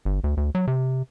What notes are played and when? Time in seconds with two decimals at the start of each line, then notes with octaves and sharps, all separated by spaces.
0.05 G1
0.24 D2
0.37 D2
0.55 F#3
0.67 C3